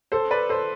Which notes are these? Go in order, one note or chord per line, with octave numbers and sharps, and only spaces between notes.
A4 C5
B4 D5
A4 C5